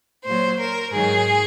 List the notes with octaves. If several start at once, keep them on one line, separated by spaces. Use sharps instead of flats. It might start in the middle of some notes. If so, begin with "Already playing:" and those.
A#2 F#3 C5
A#4
G#2 D#3 F#3 G#4